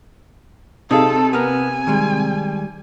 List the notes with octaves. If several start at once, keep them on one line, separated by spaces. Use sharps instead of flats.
C3 D#4 G#4 A4 F5
B3 A#4 G#5 A#5
D#3 G3 G#3